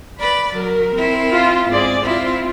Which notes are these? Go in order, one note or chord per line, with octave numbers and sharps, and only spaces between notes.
B4 D5 B5
F#3 A#4
C4 E4
F4
G#2 C4 G#4 D5
C4 E4 F4